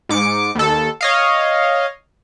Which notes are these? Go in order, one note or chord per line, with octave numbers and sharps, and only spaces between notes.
G#2 D6 C#7
D#2 A4
C#5 D#5 F5